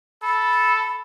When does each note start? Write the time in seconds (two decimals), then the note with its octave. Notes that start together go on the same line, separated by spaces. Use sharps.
0.23 A4 B5